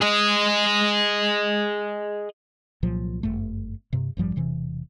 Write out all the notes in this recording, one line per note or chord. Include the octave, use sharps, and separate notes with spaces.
G#4 D#5
C2 A#2 F3 F#3
G1 F#2 A3
G2 C3
A1 G2 F3 G3
E1 C3 E3